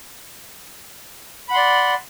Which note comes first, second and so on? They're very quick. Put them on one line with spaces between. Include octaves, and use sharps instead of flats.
B5 F#5 C6 D5